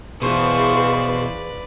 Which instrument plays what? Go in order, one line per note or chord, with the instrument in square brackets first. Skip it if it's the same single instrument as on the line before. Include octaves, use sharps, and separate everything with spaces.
[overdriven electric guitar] B2 [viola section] E3 G#4 C5 [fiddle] B4 D5 [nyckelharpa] F5 C#6